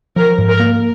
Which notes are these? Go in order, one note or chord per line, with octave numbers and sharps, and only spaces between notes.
F3 A#4
G#2
A#4
A#3